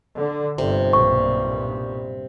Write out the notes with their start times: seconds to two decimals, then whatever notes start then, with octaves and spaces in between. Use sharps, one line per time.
0.17 D3
0.58 G1 C3
0.93 B1 G2 A#2 C#6